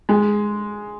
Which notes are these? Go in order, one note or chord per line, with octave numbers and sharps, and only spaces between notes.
G#3